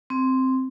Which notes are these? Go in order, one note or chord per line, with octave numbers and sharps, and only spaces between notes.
C4